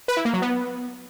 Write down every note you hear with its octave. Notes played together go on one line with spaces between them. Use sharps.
B4
E4
A#3
F#3
B3